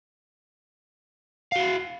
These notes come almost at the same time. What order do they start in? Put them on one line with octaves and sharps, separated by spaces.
F5 F#4 E4